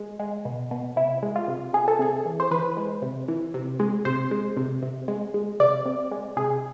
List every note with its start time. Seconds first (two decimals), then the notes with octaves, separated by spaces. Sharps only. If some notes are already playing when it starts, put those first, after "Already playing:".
Already playing: G#3
0.19 G#3
0.45 B2
0.71 B2
0.96 C3 E4
1.23 G#3
1.36 F4
1.48 C3
1.73 C3 G#4
1.88 A4
1.99 C3 G#4
2.25 E3
2.40 C5
2.51 E3 B4
2.77 G#3
3.02 C3
3.28 E3
3.54 C3
3.80 G#3
4.05 C3 C5
4.31 G#3
4.57 C3
4.83 C3
5.08 G#3
5.34 G#3
5.60 C3 D5
5.86 C3
6.11 G#3
6.37 C3 G#4